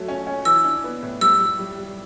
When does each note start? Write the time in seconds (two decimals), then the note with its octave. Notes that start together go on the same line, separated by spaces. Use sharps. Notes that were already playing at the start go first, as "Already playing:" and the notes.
Already playing: F#3 A3
0.08 C#4
0.27 C#4
0.45 E3 E6
0.64 D4
0.84 B3
1.03 A2
1.21 G3 E6
1.41 G3
1.59 G3
1.78 G3